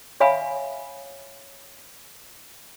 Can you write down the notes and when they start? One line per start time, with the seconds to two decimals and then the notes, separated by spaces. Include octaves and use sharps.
0.20 C#5 E5 F5 G#5 B5